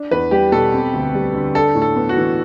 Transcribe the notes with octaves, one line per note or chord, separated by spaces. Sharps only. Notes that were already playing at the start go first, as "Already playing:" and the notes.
Already playing: D4
E2 B4
G3 G4
B2 A4
C4
D2
G3
D3
D4 A4
A2
A4
B3
F#4
E3